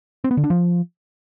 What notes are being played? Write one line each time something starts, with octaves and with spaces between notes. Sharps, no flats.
C4
B3
D3
D4
F3